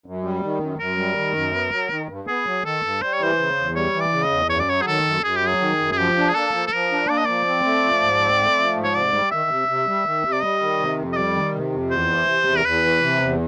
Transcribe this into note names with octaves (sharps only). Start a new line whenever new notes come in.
F#2
G3
D#3
F#2
F#2 A#4
G3
D#3
F#2
B3
F#3
D#3
G2
B3 G#4
F#3
D#3 A4
G2
G3 C5
C#5
E3 C5
C#3
E2
G3 C#5
E3
D5
C#3
D#5
E2
F#2 C#5
D5
F#3 C#5
G#4
D#3 A4
F#2
F#2 G#4
G4
F#3 G#4
D#3
F#2
G#4
F3 G4
D4
G#4
A#3 A4
F3
A4
F3 A#4
D4
A#3 D5
D#5
F3 D5
C4
A3
F3
G#2
C4
A3
F3
G#2
C#5
C3 D5
G3
D#3 E5
C3
C3
G3
D#3
C3
D5
G3 D#5
D#3
C3
F2
D#5
G3 D5
D#3
C3
F2
E2 C5
E3
C3
E2
A#4
E2 B4
E3
C3
E2